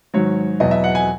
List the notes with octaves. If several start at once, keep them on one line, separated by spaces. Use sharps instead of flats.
G#2 D#3 F#3 C#5
E2 B2 F#3 D#5
E5
F#5
G#5